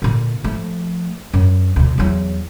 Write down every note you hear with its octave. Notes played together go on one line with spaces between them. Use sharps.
A#2 D3
F3 A3
F#2
D2 B2
E2 F#3